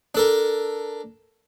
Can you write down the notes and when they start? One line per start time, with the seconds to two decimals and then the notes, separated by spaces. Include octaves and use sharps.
0.15 D4 A4 A#4